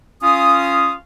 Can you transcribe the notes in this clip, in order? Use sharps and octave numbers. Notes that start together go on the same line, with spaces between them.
C#4 F4 F5 D#6